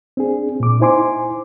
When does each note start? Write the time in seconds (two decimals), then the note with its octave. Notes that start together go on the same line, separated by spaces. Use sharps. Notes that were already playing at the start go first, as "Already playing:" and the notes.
0.17 C4 D4 G#4
0.60 A#2 D6
0.80 D#4 E4 C5 G#5 C6 D6